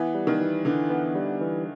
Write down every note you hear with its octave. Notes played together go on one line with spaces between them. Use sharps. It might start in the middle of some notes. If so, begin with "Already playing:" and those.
Already playing: E3 B3
G3
D#3
E3
D3 E3
B3
G3
E3